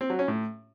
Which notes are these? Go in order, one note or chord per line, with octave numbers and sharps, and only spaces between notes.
C4
F#3
C#4
A2